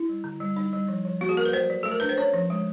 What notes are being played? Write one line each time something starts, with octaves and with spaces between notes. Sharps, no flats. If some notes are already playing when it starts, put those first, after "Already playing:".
Already playing: E4
G3
D3
G3
G3 D#4
G3
F3
F3
A#3 F#4
G#4
A#3 A#4
B4
F#3 C5
F#3
A3 A4
A#4
D4 B4
C5
C#4 C#5
F3
G#3